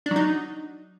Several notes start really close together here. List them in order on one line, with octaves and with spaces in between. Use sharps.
D4 F#3 D#4